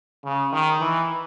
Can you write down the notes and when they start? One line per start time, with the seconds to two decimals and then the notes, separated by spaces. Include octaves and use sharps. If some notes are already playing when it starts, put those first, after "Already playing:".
0.24 C#3
0.53 D#3
0.81 E3